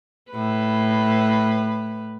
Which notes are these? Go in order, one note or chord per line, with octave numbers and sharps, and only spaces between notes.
A2 B4